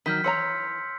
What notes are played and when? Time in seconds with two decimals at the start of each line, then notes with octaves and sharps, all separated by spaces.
0.06 D#3 F#3 F6 G6 B6
0.24 E3 C#5 A#5 C6 E6 C#7